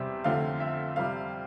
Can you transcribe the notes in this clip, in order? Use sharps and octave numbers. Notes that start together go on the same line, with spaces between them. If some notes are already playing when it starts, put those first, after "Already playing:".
Already playing: E2 C3 G3 C4 E5
F2 D3 A3 C4 F5
E5
F2 C3 G3 F5